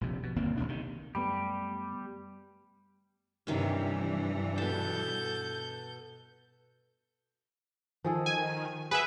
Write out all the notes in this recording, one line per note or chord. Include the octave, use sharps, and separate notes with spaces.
A#1 F2 C3
B2
G1 D#2 A#3 C4
G#1 C#2 B2 D4
C3 D#3
F#2 G3 A3 B3 G4 B5
G2 C3 D#3 E3 C#4
B2 A4 A5 G6
D#3 F3 G#4 A4
G#5
G#4 B4 E5 F#5